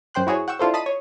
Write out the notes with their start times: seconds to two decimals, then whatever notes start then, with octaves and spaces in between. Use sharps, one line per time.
0.14 F#2 C5 G5 C6 F#6
0.27 E4 F#4 G#4 C#5
0.48 F#5 G5 C#6 E6
0.59 D4 E4 F4 A4 C5
0.74 D#5 A5 B5 D#6 C7 D#7
0.86 C#5